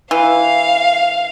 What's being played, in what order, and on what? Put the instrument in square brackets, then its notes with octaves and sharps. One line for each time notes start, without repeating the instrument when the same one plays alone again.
[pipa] E3 [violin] F5